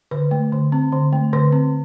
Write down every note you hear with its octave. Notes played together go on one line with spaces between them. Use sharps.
D3 B4
A3
D3
C4
D3
A3
D3 B4
C4